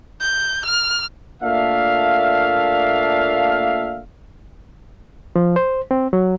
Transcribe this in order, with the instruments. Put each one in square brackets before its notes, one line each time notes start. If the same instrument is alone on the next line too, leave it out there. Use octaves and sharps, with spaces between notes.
[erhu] G6
F6
[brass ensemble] A#2 A3 A#3 D4 E5 F5
[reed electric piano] F3
C5
C4
F#3